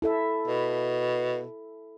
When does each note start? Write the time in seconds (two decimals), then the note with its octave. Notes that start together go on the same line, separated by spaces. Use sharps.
0.02 E4 A4 E5
0.47 B2